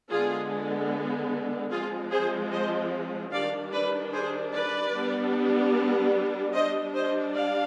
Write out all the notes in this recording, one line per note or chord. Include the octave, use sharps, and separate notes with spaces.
D3 G#3 B3 F4 G#4
F3 G#3 C4 F4 G#4
G#4 C5
C5 D#5
D#3 G3 D4 D5 F5
B4 D5
G#4 C5
B4 D5
G3 B3 D4
G3 D4 C5 D#5
C5 D#5
D5 F5